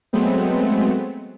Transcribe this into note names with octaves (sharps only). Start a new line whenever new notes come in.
F#3 G#3 A3 B3 C4